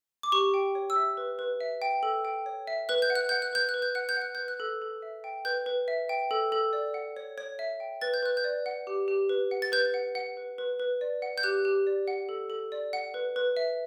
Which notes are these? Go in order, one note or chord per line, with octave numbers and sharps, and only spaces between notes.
D6
G4 C#6
G5
C#5
E6
E5
B4
B4
E5
G5
A4
G5
C#5
E5
B4 F#6
G6
F#5
F#6
F#5 G6
F#6
B4 G6
F#6
B4
G6
F#5 F#6
G6
F#5
F#6
B4 G6
F#6
A4
A4
E5
G5
B4 G6
B4
E5
G5
A4
A4
D5
F#5
C#5
C#5
E5
G5
B4 A6
G6
B4 F#6
G6
D5
F#5
G4
G4
B4
F#5
A6
B4 G6
F#5
F#5
B4
B4
B4
D5
F#5
G6
G4 F#6
G4
D5
F#5
A4
A4
D5
F#5
B4
B4
E5